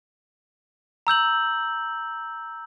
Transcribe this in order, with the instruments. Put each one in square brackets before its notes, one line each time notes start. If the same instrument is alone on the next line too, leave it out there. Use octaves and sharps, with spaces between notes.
[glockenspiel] A#5 E6 G6 F#7